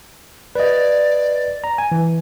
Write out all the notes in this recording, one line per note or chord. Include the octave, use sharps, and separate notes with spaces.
B4 D5 D#5
A#5
G#5
E3